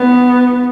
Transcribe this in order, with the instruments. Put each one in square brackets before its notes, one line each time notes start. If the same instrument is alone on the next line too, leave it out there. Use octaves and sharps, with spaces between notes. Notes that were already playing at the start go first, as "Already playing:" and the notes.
Already playing: [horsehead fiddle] B3